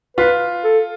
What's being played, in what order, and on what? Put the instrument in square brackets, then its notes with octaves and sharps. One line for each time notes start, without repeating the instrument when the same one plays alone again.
[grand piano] F4 [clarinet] B4
[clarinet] A4